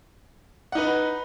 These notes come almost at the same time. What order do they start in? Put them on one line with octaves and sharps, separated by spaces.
F#5 D#4 B4